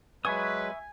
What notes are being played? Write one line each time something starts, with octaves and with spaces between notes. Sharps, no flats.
F#3 G#3 B4 E5 G#5 C#6 D#6